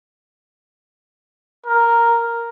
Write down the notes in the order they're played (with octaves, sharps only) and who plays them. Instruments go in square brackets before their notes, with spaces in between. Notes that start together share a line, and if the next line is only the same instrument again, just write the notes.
[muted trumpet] A#4